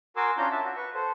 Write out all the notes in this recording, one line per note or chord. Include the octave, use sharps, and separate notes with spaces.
F#4 A#4 G#5 C6 D6 E6
C#4 D4 F4 A#5 G6
E5 A5
F#4
B4 C#6
A4 C5